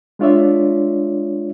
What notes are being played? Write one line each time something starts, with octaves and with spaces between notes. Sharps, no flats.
G#3 D4 F4 C#5 D5 E5